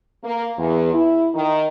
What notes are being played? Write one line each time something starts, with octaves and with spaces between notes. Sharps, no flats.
A#3
E2
E4
D#3